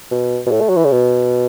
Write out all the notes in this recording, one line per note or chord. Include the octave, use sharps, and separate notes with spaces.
B2
B2
A2
A3
F#3
E3
C#3
B2